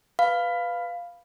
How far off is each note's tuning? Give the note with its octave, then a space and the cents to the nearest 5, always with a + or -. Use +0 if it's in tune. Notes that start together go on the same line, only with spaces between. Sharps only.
B4 +0 F5 +0 B5 +0